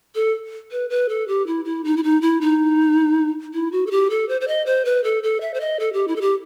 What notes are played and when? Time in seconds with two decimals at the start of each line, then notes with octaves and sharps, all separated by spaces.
0.15 A4
0.71 B4
0.90 B4
1.09 A4
1.28 G4
1.47 E4
1.65 E4
1.84 D#4
1.97 E4
2.03 D#4
2.22 E4
2.41 D#4
3.53 E4
3.72 F#4
3.87 A4
3.91 G4
4.10 A4
4.29 C5
4.41 C5
4.48 D#5
4.66 C5
4.85 B4
5.04 A4
5.23 A4
5.41 E5
5.54 C5
5.61 D#5
5.80 A4
5.93 G4
6.08 E4
6.16 A4
6.21 G4